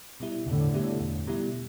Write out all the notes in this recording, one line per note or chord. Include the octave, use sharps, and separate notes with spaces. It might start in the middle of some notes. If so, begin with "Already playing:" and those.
B2 G3 E4
E2 A2 D3
B2 G3 E4
E2
B2 G3 E4